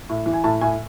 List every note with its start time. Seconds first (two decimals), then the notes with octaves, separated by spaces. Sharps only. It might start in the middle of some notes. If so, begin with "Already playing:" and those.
0.09 A2
0.26 E3
0.33 G#5
0.44 A2 A5
0.61 A2 G#5